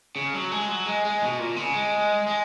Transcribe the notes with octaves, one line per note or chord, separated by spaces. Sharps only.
C#3
F#3
G#3
F#3
G#3
G#3
B2
A#2
C#3
G#3
G#3